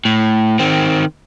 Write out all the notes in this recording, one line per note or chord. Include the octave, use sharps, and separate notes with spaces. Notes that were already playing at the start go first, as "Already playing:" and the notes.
A2
D#3 C4